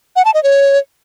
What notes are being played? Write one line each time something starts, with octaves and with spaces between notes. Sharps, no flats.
F#5
A5
D#5
C#5